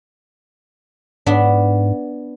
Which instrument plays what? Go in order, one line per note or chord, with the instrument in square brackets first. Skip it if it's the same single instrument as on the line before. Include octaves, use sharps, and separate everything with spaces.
[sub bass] G#2 [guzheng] B3 D4